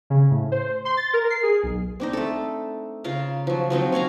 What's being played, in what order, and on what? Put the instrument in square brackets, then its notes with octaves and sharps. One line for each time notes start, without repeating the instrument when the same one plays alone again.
[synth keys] C#3
A2
C5
C6
A6
A#4
C7
G#4
B1
[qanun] C4 D4 D#4
A3 A4
C#3 F4 F5 A#5
F3 F#3
F3 F#3 C4 D#4
C#4 C#5 F5 A#5